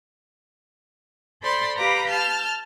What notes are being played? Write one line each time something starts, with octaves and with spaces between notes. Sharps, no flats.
A4 C5 D5 B5 C6
G4 B4 F5 A#5 B5 D6
A5 F6 G6